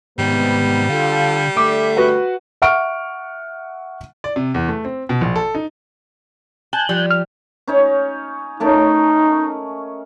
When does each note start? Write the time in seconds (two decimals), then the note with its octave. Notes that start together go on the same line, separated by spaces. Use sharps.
0.19 G#2 C3 D#3 G3 B3
0.89 D3 F4 A4 F5
1.57 D3 A3 E5 D6
1.97 F#4 B4 F#5
2.62 E5 F#5 C#6 F6 D7
4.24 D5
4.36 C3
4.54 E2
4.69 A3
4.85 C4
5.09 B2
5.21 A#1
5.36 A4
5.55 D#4
6.73 G#5 A5 F#6 G6
6.89 F3 G3
7.11 F6
7.67 C#4 D#4 C#5
8.60 A3 C#4 D#4 A#4